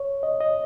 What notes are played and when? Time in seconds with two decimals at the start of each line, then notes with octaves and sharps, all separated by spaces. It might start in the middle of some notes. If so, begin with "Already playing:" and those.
Already playing: C#5
0.23 D#5
0.41 D#5